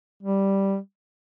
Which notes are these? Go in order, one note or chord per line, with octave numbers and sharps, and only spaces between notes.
G3